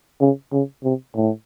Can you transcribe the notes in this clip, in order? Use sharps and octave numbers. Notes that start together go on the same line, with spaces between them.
C#3
C#3
C3
A2